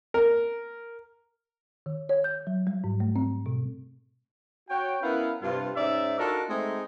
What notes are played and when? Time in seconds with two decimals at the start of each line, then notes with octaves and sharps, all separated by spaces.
0.14 A#4
1.86 D#3
2.09 C#5
2.24 G6
2.47 F#3
2.67 G3
2.84 G#2
3.00 A3
3.16 C4
3.46 B2
4.69 F#4 C#5 G5
5.02 B3 C#4 E4 A#4 B4 F5
5.42 G2 C3 F4
5.76 G#2 C#4 D#4 D5 E5
6.19 D4 D#4 F4 F#4 A4 A#4
6.49 G#3 A3 C4 D#4 G#4